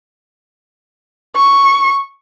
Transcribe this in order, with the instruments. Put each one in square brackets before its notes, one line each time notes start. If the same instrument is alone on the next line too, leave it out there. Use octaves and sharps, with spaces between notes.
[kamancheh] C#6